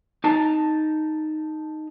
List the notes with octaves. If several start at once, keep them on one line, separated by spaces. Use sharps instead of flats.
D#4 A5 A#5